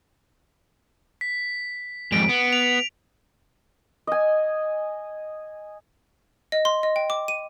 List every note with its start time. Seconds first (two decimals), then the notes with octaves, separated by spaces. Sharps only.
1.21 B6
2.12 F2 G#2 D7
2.29 B3
2.53 F7
4.07 D#5 G#5
6.52 D#5
6.65 C6
6.83 D#5
6.96 G5
7.10 D6
7.28 D#7